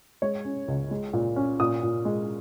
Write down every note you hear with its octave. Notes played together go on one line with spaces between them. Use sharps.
G#3 C#5
C#4
C#2
G#3
A#2
C#4
A#2 D#6
A#2
G#3